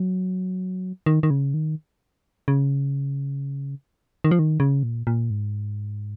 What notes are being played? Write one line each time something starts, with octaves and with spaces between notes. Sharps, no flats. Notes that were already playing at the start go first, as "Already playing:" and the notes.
Already playing: F#3
D#3
D#3
C#3
D#3
C#3
D#3
F3
D#3
C#3
A#2
A#2
G#2